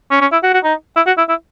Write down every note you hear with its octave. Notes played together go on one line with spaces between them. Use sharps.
C#4
C#4
E4
F#4
F#4
D#4
E4
F#4
E4
E4